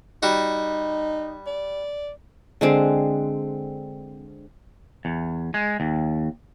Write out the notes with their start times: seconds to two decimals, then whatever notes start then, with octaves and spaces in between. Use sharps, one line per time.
0.23 G3 D#4 F#4
1.46 D5
2.61 D3 G#3 C4
5.05 E2
5.54 G#3
5.80 D#2